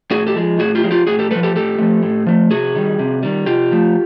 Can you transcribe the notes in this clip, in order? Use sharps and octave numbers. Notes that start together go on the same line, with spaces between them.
A2 F#4 G#4
G4 A4
F3 G#3
A2 F#4 G#4
F4 G4
F3 G#3
F4 G4
A2 F#4 G#4
G4 A4
G#3 A4 B4
F3
G4 A4
A2 G4 A4
F3 A3
A2
F3 A3
C3 F#4 G#4
D#3 G3
C3
D#3 G3
C3 F4 G4
F3 A3